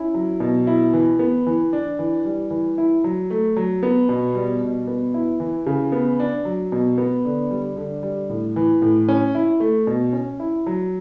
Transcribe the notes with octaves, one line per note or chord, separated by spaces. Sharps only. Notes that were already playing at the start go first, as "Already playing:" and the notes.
Already playing: C#4 E4
F#3
B2
E4
E3
B3
E3
D4
E3
G3
E3
E4
F#3
A3
F#3
B3
B2
G3
B2
B3
E4
E3
C#3
B3
D4
F#3
B2
B3
D3
G3
D3
G3
A2
E3
A2
C#4
E4
A3
B2
C#4
E4
F#3